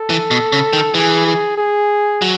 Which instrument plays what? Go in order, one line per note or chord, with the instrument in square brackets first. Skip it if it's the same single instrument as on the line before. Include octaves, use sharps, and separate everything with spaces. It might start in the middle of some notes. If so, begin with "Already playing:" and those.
Already playing: [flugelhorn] A4
[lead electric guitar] E3
B2
C#3
D#3
[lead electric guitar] E3 [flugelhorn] G#4
[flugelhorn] G#4
G#4
[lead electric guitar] F#3